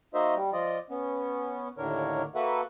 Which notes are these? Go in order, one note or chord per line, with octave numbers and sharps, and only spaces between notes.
A#3 D#4 F#4 C5 D#5 E5
G3
F3 F4 D5 D#5
B3 C#4
D#2 A2 D3 D4 A#4 C#5
A#3 F#4 A4 B4 E5 F#5